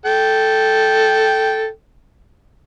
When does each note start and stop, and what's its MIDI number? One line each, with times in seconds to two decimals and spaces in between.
0.06 1.68 69
0.06 1.68 79